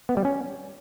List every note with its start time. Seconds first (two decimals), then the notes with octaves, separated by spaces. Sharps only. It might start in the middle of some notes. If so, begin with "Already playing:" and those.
0.09 B3
0.17 G3
0.25 C#4